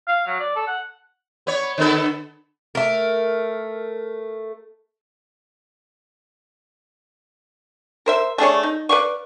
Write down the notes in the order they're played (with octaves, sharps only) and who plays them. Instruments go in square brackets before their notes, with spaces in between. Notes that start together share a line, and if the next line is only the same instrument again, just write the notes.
[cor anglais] F5
F#3
D5
A4
F#5
[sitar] B3 C#5
D3 B3 A4
[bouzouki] A3 A#4
[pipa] A#4 C5 E5
A3 D4 G#4 C#5
D#4
B4 D5 F5 C#6